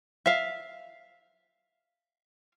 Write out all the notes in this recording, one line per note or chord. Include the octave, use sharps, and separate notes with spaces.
E5 F5